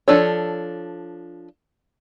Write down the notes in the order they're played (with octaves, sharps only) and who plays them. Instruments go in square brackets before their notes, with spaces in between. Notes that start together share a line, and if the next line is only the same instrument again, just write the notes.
[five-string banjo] F3 D4 A4 C#5